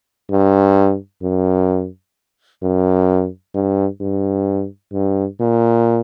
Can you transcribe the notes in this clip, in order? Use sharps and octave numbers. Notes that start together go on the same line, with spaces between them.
G2
F#2
F#2
G2
G2
G2
A#2